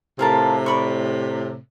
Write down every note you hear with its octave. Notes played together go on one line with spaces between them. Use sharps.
A2 C3 F4 A#4 A5
D5 B5 C#6